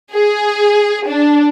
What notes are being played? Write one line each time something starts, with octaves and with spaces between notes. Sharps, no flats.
G#4
D4